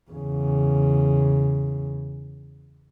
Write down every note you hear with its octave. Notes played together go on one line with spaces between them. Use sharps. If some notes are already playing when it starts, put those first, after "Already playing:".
E2 C#3